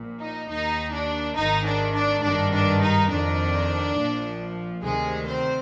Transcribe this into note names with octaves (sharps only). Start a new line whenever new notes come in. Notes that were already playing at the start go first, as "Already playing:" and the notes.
Already playing: A#1 A#2
D#4
D#2 D#3 D#4
D4
G#1 G#2 D#3 D#4
D4
D4
G#1 G2 D#3 D4
D4
D#4
F2 D#3 D4
A#1 A#2 F3
D2 C3 D#3 G#3 G#4
C4 C5